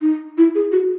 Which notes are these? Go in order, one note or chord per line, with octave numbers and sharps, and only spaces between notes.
D#4
E4
G#4
F#4